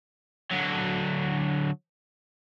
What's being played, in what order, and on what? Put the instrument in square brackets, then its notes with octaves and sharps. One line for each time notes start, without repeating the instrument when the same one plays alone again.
[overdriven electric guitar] D3 F#3